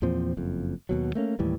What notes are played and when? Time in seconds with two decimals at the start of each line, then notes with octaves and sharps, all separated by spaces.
0.02 E2 A#2 F3 C4
0.37 F#1 F2
0.89 D#2 B2 F#3
1.15 A3 A#3 C#4
1.39 D#2 A2 E3 G3